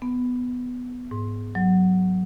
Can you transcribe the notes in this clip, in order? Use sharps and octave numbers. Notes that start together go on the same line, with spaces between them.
B3
G#2
F#3